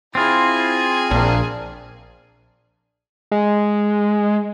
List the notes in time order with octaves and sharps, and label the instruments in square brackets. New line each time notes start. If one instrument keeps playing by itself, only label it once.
[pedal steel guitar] C4 F4 [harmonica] E4 [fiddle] G#4
[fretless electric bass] A#1 [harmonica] A#3 D4
[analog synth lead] G#3